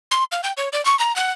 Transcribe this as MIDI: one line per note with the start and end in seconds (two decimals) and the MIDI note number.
0.11 0.24 84
0.32 0.41 77
0.44 0.53 79
0.57 0.69 73
0.73 0.83 74
0.85 0.98 85
0.99 1.15 82
1.16 1.32 78